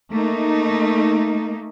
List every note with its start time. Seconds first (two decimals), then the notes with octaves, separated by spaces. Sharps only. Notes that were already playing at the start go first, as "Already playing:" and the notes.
0.11 A3 A#3 D#4